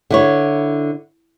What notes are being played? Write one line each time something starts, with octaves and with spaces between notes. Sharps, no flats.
D3 E4 C#5